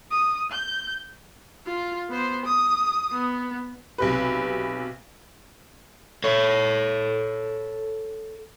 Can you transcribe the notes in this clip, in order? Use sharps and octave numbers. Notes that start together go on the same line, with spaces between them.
D#6
G6
F4
B3 C5
D#6
B3
B1 C3 B4
A4 C#5